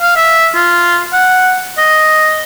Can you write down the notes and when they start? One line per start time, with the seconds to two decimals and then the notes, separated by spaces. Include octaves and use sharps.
0.01 F5
0.16 E5
0.55 F4
1.13 F#5
1.78 D#5